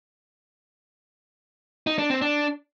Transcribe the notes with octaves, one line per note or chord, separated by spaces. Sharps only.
D#4
D4
C4
D4